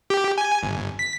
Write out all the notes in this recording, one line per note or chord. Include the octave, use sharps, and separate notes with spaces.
G4
G#5
G1
B6